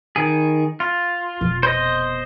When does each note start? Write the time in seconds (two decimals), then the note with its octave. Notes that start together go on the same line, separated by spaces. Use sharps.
0.16 D#3 G#4
0.80 F4
1.41 F1 B2
1.63 C5 D#5